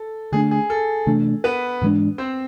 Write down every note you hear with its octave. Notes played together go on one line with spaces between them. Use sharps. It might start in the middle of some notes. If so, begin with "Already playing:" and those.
Already playing: A4
D3 A3 D4 G#4
G#4
A4
C3 E3 A3 D4
B3 B4
G#2 E3 G#3 D4
C4 C5